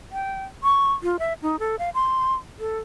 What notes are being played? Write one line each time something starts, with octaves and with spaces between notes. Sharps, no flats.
G5
C#6
F4
E5
D#4
A4
F5
C6
A4